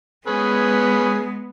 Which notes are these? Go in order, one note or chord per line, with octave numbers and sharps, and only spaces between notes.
G#3 B3 C#4 G#4 B4